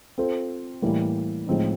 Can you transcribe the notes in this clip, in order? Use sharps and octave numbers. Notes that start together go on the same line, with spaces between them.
C4 F4 A4 C5
A2 E3 G3 A#3
A2 F3 G#3 C4 D#4